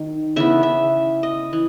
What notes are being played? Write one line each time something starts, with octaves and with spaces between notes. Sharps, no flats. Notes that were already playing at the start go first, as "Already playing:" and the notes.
Already playing: D#3
C#3 E3 B3 E5
E5
D#5
E3